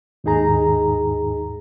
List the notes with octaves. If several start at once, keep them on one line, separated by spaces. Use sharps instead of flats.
D#2 G#2 D#4 G#4 A#5